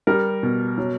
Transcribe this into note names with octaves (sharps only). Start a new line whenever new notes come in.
G3 A#4
B2
F#3